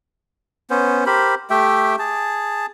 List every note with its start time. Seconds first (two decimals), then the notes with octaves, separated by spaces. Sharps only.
0.70 B3 C#4 C5
1.06 G4 A#4 C5 B5
1.50 A3 G4 E5 G5
1.99 G#4 A5